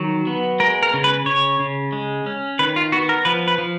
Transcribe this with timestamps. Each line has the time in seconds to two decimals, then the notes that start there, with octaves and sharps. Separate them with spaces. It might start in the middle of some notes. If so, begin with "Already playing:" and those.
Already playing: D#3 F#3
0.27 B3
0.60 G#3 A#4
0.83 A#4
0.94 C#3
1.04 B4
1.26 C#3 C#5
1.60 C#3
1.93 G#3
2.26 C#4
2.59 D#3 B4
2.76 F4
2.92 B3 F#4
3.09 A#4
3.25 F3 B4
3.48 B4
3.58 F3